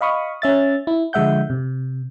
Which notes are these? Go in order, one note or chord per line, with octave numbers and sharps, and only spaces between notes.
D#5 F5 B5 C#6 D#6
C#4 E5 A6
E4
D3 F3 G#3 E5 F#5 G6
C3